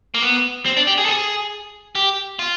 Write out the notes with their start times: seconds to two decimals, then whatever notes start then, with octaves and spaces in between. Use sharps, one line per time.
0.14 A#3
0.23 B3
0.66 C4
0.77 D4
0.87 G4
0.98 G#4
1.06 A4
1.08 G#4
1.95 G4
2.39 F4